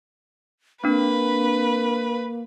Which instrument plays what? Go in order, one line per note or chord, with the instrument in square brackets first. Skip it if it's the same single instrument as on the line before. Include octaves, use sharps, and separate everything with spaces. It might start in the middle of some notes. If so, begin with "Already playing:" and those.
[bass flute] A#3 [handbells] C4 D4 [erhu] B4